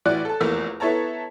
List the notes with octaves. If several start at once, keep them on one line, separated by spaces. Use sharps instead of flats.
A1 E3 F#4 D5 F#6
A4 A5
F1 E2 A#3 E6
B3 E4 A4 C#5 A5 A#5